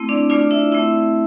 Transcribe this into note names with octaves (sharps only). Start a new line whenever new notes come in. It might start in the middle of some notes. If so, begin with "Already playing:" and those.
Already playing: A3 C4 E4
D4 D5
A3 D4 F4 D5
E4 E5
A3 C4 E4 E5